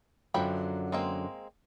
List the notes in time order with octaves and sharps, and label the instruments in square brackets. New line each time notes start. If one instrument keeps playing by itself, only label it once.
[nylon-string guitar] F#2 D3 F#3 [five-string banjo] F3 G5 B5
[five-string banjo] G#3 A#3 C4